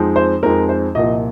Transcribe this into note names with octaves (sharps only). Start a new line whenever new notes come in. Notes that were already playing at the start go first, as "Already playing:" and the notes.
Already playing: F2 F3 G#3 C4 D#4
C5
F2 F3 G#3 C4 D#4 A#4
C5
C2 A#2 F3 D#5